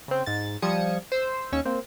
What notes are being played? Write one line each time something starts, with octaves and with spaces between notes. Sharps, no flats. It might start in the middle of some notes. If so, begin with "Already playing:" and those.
C#3 C4
G#2 A6
F3 G3 D#6 G#6 C#7 E7
C5 E6
D#2 C#4 C#6 E6
A#3 C4